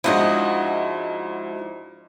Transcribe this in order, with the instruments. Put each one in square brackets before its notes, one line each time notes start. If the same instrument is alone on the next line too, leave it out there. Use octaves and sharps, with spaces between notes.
[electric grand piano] G#2 D4 E4 [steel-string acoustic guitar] F3 F#4 D#5